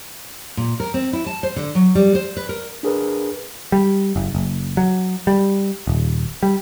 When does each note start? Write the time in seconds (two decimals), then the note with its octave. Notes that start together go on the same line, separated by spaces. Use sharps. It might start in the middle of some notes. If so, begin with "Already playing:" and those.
0.57 A#2
0.80 A#4
0.94 C4
1.13 E4
1.26 A5
1.43 C5
1.56 D3
1.75 F#3
1.95 G3
2.15 C5
2.37 B4
2.49 A#4
2.83 D4 G#4 A#4 B4
3.72 G3
4.16 F#1
4.35 F#1
4.77 F#3
5.27 G3
5.87 D#1
6.43 G3